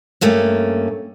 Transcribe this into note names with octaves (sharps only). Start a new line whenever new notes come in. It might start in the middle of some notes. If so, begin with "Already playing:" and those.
G2 A3 A#3 C#4